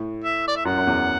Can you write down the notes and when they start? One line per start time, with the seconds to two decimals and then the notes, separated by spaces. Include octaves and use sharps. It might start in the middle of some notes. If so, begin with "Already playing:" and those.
Already playing: A2
0.24 E5
0.48 D5
0.57 E5
0.65 F#2 F#5
0.77 F#2
0.87 E2